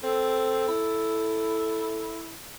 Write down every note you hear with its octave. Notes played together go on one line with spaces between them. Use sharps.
C4 A4
E4